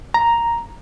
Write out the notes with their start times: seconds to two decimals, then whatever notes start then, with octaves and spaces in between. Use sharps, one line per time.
0.14 A#5